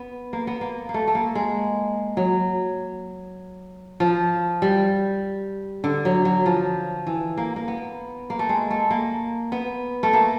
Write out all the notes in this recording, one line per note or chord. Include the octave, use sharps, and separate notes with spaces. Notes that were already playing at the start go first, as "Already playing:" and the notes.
Already playing: B3
A#3
B3
A#3
A#3
A3
A3
A#3
G#3
F#3
F3
G3
D3
F#3
F#3
F3
E3
A#3
A#3
B3
A#3
A3
G#3
A3
A#3
B3
A3
A#3